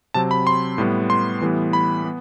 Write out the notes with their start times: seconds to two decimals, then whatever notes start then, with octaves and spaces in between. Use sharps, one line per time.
0.14 C3 F#3 C4 A5
0.31 B5
0.47 C6
0.78 A2 G3 B3
1.10 C6
1.41 A2 E3 G3 B3
1.73 B5
2.05 B3